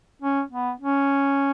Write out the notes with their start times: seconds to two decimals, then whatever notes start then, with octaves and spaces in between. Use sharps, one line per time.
0.22 C#4
0.52 B3
0.80 C#4